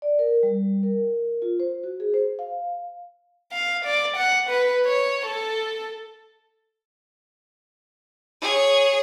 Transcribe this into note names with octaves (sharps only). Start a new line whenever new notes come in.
D5
A#4
G3
A#4
F4
C5
F#4
G#4
C5
F5
F5
D5
F#5
B4
C#5
A4
G#4 C#5